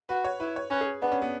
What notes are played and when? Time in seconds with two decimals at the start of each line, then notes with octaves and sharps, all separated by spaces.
0.09 F#4 B4
0.25 C#5
0.40 E4 B4
0.56 C#5
0.71 C#4 B4
0.81 G#4
1.02 B3 D4
1.12 C#4
1.22 B3